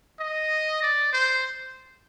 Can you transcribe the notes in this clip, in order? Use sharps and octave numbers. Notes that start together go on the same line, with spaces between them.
D#5
D5
C5